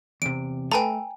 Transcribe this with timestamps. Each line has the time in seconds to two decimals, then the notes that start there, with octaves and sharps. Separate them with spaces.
0.22 E2 C3 D7
0.72 A3 A4 B4 G5 G#5 A#5